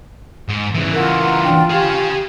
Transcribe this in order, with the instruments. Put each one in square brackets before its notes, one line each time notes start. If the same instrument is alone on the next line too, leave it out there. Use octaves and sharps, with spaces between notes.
[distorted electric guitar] G#2
C#3 E3
[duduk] F4 [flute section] A#4 F#5 E6
[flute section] F#5 A#5
D4 G5
[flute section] G4 [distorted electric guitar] G#4 F5